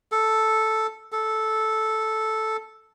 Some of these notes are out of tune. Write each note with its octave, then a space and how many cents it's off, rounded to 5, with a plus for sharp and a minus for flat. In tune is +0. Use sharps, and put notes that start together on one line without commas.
A4 +0
A4 -5